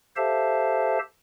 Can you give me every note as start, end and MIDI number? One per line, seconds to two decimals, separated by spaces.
0.16 0.99 67
0.16 0.99 69
0.16 0.99 72
0.16 0.99 76
0.16 0.99 77
0.16 0.99 81